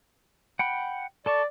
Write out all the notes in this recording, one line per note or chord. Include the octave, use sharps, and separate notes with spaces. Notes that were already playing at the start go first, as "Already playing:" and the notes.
F#5 G5 B5
A4 D5 A5 C#6